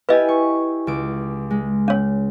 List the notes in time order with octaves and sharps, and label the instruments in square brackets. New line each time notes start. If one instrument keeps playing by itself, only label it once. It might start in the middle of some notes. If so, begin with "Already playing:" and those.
[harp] E4 G4 G#5 [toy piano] B4 D#5
[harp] C#6
C#2 D6
G#3
[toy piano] C#4 C#5